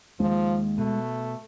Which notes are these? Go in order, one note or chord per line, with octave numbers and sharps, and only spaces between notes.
D#2 F3 G#3
B2 A3